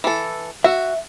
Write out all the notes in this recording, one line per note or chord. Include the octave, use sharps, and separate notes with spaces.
E3 A4
F#4 E5